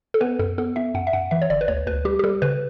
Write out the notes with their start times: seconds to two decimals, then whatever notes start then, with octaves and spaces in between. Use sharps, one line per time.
0.14 A4
0.21 B3 B4
0.39 F#2 A4
0.58 B3 A4
0.76 B3 E5
0.94 F#2 F#5
1.07 E5
1.13 F#2 F#5
1.31 E3 E5
1.42 C#5
1.50 G1 D5
1.61 B4
1.68 D2 C#5
1.87 D2 B4
2.05 G3 G4
2.19 G4
2.24 G3 A4
2.42 C#3 B4